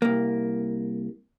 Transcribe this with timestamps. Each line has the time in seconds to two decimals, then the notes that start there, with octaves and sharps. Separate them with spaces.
0.02 C2 A#3